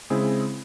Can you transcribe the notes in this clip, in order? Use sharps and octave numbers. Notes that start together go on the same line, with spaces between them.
C#3 G#3 C4 E4 G#4